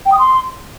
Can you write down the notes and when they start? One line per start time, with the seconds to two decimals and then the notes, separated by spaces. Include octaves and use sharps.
0.06 G5
0.12 D#6
0.19 C6